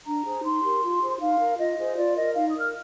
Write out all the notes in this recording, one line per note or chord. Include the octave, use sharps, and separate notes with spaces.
D4 A#5
G#4 C5
D#4 C6
G4 A#4
F4
G#4 C5
D#4 F5
A#4
F4 D#5
G#4 C5
F4 D5
A#4 D#5
D#4 F5
D#6
A#4
F6